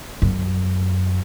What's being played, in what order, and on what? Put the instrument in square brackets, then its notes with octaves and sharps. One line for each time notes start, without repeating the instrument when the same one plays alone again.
[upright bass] F#2